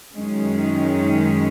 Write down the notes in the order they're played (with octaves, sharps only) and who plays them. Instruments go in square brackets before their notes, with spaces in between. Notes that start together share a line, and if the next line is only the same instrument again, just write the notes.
[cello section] F#2 D#3 G#3 C#4